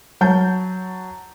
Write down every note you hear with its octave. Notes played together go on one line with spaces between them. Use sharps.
F#3 A5 G6